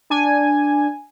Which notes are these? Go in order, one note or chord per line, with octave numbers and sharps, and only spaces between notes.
D4 G#5